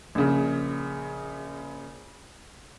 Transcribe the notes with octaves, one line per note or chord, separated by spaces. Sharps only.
A#1 C#3